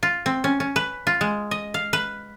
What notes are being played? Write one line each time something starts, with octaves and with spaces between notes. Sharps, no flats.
F4
C4
C#4
C#4
B4
F4
G#3
D#5
F5
B4